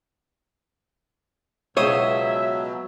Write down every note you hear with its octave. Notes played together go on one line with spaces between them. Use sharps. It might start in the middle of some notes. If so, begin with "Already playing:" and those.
C#2 B2 F#3 C5 C#5 E5 D#6